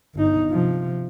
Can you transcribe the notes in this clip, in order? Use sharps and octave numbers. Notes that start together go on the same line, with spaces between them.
G1 D#4
C3 F3